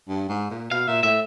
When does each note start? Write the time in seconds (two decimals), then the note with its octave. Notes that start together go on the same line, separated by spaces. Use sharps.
0.08 G2
0.29 G#2
0.50 A#2
0.71 B2 F5
0.88 A#2 E5
1.03 A2 E5